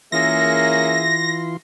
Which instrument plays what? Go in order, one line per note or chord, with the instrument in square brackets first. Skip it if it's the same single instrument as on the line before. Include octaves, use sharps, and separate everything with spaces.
[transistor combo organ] E3 F4 C6 [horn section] A#3 C#4 [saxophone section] G#4 E5 [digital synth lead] A#6